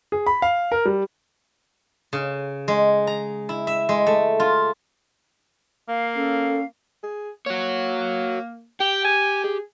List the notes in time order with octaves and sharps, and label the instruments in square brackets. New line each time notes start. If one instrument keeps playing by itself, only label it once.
[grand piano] G#4
B5
F5
A#4
G3
[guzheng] C#3
G#3
A#5
E4
E5
G#3
A3
F4
[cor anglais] A#3 [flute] F5
[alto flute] C#4 [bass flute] A4
[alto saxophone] G#4
[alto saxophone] A#3 [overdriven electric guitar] F#4 C#5
[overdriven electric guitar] G4 [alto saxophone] G5
[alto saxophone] G#5
G#4